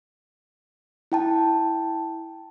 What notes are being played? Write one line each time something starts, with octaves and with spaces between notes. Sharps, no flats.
E4 G5 A5